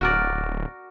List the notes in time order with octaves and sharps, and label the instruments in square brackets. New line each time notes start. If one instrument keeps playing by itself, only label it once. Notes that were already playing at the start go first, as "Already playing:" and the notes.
[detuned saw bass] D1 [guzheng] F#4 A#4 D5